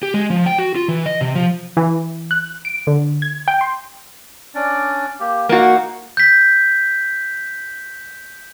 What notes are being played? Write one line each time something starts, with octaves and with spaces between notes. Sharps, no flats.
G4
G#3
F3
G5
F#4
F4
E3
D#5
C3
F3
E3
F#6
D7
D3
G#6
G5
C6
C#4 D4 D5
A#3 G4
A#3 D#4 F#4 F5
G6 B6